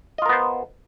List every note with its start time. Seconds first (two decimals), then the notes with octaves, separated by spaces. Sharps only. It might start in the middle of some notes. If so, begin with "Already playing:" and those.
0.18 D#5
0.22 F4
0.26 A#4
0.29 B3
0.33 C5